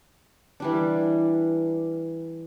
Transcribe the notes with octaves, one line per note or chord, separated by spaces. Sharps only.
E3 G3 D4